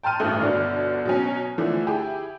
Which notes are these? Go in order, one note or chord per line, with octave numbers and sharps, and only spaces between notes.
G5 A5 C6 F6 D#7
A1 D2 G2 A3 F#6
G1 B2 D3 D4 F6
B2 F#3 C#4
D3 E3 F3 A3
E4 G4 G#4